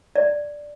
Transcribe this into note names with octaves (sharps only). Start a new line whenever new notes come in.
D5